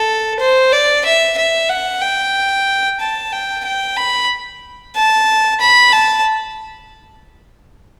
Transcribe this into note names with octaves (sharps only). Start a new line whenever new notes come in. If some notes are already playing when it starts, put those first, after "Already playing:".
Already playing: A4
C5
D5
E5
E5
F#5
G5
A5
G5
G5
B5
A5
B5
A5